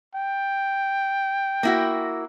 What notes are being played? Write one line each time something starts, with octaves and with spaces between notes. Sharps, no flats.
G5
A#3 E4 F#4